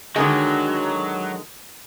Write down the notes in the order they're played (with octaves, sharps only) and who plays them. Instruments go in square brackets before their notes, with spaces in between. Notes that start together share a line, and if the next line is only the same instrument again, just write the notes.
[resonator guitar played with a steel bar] D3 D#3 G#3 [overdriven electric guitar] F#3